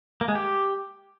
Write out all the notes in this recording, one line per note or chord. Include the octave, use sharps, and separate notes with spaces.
A#3
G#3
G4